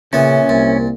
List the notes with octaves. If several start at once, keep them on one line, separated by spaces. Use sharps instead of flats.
A#2 C#3 B3 C#4 E5
C2 A#2